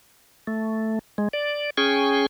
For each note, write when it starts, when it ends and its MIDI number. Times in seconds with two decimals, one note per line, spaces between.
0.47 0.99 57
1.18 1.28 56
1.33 1.70 74
1.77 2.26 61
1.77 2.26 68
1.77 2.26 79
1.77 2.26 80
1.77 2.26 85